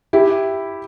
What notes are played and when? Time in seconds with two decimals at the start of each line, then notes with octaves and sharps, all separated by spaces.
0.13 E4 G4